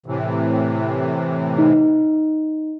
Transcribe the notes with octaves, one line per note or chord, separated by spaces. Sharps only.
A2 C3 E3
D#4